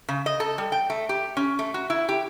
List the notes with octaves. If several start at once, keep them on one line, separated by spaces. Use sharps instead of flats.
C#3
D#5
A4
G3
G5
A3
G4
C#4
A3
F#4
E4
G4